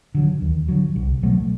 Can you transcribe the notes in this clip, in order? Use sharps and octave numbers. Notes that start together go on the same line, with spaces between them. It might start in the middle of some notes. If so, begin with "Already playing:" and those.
D3 F#3
D#2
D3 F#3
C2
B2 F#3 A3